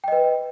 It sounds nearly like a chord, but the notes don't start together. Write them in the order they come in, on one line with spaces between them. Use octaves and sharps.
G5 D#5 B4